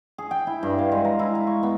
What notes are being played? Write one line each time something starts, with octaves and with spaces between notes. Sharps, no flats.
G#4
G5
E4
G2
F5
G#3
A#5
E4
F5
C#6
B3